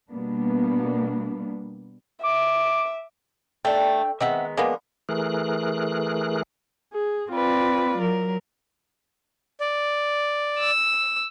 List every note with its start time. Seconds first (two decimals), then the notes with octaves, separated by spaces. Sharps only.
0.10 B2 G3 A#3 B3 D4
2.23 E5 D6
3.65 A3 D4 G5
4.20 D#3 G#3 B3 C4 E5 F#5
4.57 F3 G#3 A#3 B3 D4
5.09 E3 A3 G#4 A#4 F#6
6.93 G#4
7.31 C4 F4 B4 D5
7.98 F#3 A#4
9.60 D5
10.58 E6